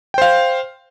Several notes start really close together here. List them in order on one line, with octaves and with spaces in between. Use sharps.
G5 C5 F5